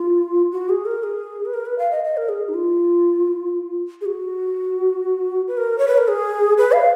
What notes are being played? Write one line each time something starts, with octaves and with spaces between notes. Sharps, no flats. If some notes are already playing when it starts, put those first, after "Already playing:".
Already playing: F4
F#4
G#4
A#4
G#4
B4
A#4
B4
F5
D#5
D#5
A#4
G#4
D#4
F4
G#4
F#4
B4
A#4
C#5
B4
A#4
G#4
B4
F5